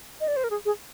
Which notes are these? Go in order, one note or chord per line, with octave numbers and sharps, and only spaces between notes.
D#5
D5
C5
A#4
G#4
G#4